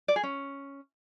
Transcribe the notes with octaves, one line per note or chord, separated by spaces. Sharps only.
D5
G#4
C#4